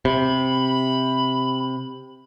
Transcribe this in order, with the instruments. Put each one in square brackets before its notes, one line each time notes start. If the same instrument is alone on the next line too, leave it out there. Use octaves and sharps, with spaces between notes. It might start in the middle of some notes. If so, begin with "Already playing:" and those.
[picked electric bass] C3 [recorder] B5